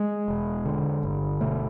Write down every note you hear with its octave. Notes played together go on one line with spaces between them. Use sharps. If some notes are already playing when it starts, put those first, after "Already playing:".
Already playing: G#3
E1
D3
G1
B2 A3